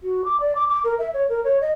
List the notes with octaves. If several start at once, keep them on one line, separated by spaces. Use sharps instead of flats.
F#4
D6
D5
D6
D6
A#4
E5
C#5
A#4
C#5
D#5